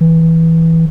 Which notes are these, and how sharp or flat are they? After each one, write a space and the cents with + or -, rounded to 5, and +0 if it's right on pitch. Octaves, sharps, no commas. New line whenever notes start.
E3 -10